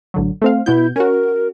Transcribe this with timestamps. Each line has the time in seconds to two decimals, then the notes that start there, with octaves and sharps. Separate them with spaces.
0.14 A1 D3 F#3
0.42 A3 C4 F5
0.66 B2 B3 E4 G6
0.96 C#4 F#4 A#4